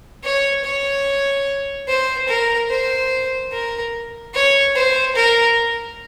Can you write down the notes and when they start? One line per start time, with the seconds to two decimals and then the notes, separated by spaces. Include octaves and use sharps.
0.24 C#5
0.64 C#5
1.88 C5
2.28 A#4
2.70 C5
3.52 A#4
4.34 C#5
4.75 C5
5.16 A#4